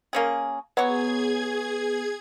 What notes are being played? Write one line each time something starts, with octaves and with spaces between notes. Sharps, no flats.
A#3 C#4 G#4
F#3 B3 G#4 C#5 C#6 G#6